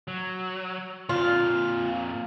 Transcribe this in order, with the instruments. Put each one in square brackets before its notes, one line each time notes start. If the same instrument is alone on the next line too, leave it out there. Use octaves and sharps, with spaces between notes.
[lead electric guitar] F#3
[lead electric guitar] F2 A#2 [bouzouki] F4